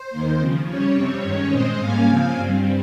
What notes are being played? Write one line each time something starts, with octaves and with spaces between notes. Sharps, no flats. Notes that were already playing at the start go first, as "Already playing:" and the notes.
Already playing: C5
D#2 D#3 A#3
C#3 F3 C4
C#3 G3 C#4 C#5
F2 C3 G3 C4
G2 D#3 G#3 C#4 C#5
A#2 G#3 C4 C5 D#5
G#2 G3 A#3 C#4 F5 G#5
C#3 F3 C4
G2 G3 C4